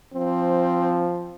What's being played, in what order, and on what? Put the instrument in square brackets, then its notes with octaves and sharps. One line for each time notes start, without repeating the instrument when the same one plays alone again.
[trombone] F3 [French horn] C4